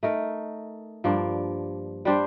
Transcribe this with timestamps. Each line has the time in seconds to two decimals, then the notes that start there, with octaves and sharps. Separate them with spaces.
0.03 A3 D#4 A#4
1.04 G2 F3 A#3 D4
2.05 G3 D4 G4 C5